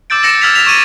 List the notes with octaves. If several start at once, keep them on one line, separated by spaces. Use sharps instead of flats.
D6 E6 G6 A6 D7
E6 A6 A#6 C#7 E7
E6 F6 G#6 A6 B6 F7
F6 B6 F7
C#6 D6 G#6 A6 D#7 E7